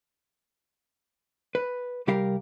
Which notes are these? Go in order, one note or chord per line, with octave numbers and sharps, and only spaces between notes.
B4
C2 G3 G4 A#4 F5